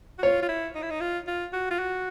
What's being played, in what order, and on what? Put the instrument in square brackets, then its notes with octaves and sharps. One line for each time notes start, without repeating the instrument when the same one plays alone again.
[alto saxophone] F#4
[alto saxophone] F4 [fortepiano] C#5
[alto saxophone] F4
E4
D#4
E4
D#4
F4
F4
F#4
F4
F#4